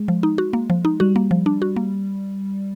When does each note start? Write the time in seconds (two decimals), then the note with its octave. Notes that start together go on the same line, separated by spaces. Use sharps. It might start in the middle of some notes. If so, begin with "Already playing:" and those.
Already playing: G#3
0.08 F3
0.23 D#4
0.38 F#4
0.53 A#3
0.70 F3
0.85 D#4
1.00 G3 F#4
1.16 A#3
1.31 F3
1.46 D4
1.62 F#4
1.76 A#3